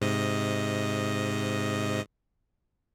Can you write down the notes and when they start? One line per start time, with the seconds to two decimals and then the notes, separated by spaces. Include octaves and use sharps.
0.01 G#2 C3 D#5